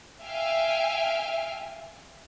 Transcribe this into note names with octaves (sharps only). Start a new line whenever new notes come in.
E5 F5 G5 G#5 F6